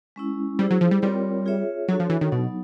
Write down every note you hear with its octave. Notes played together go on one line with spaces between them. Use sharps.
G#3 C#4 E4
G3 E4 G#4 C5
F#3
F3
G3
G3 C4 F4 A#4 C#5
F4 G#4 C#5 E5
F#3 D4 F#4 A4 C#5
F3
E3
D#3
B2 F#3 B3 D#4